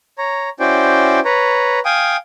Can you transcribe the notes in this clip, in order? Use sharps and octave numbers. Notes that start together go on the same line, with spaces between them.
C#5 A#5
C#4 E4 F#4 C5 D5 G5
B4 C#5 A#5
F5 G5 G#5 D#6